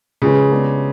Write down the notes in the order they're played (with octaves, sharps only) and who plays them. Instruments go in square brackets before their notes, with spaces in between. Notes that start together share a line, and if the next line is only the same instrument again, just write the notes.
[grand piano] C#3 [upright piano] F3 G#3 C#4 G#4 B4
[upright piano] F3 G#3 B3 D4